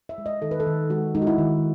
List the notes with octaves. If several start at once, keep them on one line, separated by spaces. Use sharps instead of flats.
E5
G#3
D#5
D#3 A4
B4
A4
D#3
G#3 F#4
G#3 D#4
F#4
E4
D#3